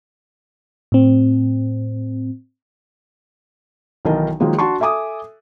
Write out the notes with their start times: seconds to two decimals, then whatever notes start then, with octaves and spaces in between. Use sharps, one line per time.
0.92 A2 C4
4.05 B1 D#3 E3 A#4 D#5 A5
4.40 D#3 F3 F#3 G#3 A#3
4.59 D4 F#4 A5 C6 C#6
4.80 A4 E5 G#5 D6 D#6